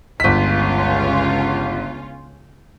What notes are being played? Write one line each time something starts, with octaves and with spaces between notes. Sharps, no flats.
G1 C#2 C#4 F4 B6